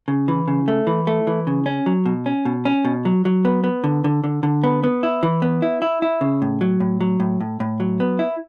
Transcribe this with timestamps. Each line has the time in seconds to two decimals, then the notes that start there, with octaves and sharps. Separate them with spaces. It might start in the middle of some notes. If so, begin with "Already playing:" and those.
0.08 C#3
0.28 E3
0.48 C#3
0.68 A3
0.87 E3
1.07 A3
1.27 E3
1.47 C#3
1.66 C#4
1.86 F#3
2.06 B2
2.26 C#4
2.45 B2
2.65 C#4
2.85 B2
3.05 F#3
3.25 F#3
3.45 B3
3.64 B3
3.84 D3
4.04 D3
4.24 D3
4.43 D3
4.64 B3
4.84 B3
5.03 E4
5.23 E3
5.42 B3
5.62 E4
5.82 E4
6.02 E4
6.21 C#3
6.42 A2
6.61 F#3
6.80 A2
7.01 F#3
7.20 A2
7.41 A2
7.60 A2
7.80 F#3
8.00 B3
8.19 E4